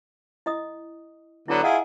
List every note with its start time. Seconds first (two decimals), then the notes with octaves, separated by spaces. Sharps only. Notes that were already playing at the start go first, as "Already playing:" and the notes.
0.46 E4 D#5 D#6
1.48 D3 F#3 B3 E4 A#5
1.63 E4 F4 G#4 D#5 F#5